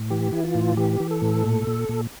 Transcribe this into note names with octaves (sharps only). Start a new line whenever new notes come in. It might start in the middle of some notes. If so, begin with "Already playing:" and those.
Already playing: A2
E3 G4
E3 E4
F4
A2
E3 G4
E3
A4
A2
A#2
A#2
A#2